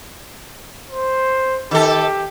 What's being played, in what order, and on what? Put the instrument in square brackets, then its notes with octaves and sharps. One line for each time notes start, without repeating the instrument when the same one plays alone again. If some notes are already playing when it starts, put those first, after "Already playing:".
[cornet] C5
[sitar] D#3 A4 [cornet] G4